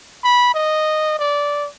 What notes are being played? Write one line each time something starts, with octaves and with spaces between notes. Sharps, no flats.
B5
D#5
D5